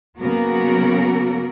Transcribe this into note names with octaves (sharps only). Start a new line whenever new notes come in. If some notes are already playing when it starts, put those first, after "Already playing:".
C#3 F#3 A#3 B3 F#4 A#4